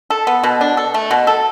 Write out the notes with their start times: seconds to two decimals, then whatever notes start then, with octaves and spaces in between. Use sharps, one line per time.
0.10 A4
0.27 B3
0.44 B2
0.61 D4
0.77 A4
0.94 A3
1.11 B2
1.27 A4